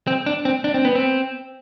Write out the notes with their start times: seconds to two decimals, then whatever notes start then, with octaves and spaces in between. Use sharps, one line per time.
0.07 C4
0.26 D4
0.45 C4
0.64 D4
0.74 C4
0.85 B3
0.95 C4